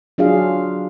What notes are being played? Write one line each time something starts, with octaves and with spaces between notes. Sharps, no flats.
F#3 D4 F4 G#4 F5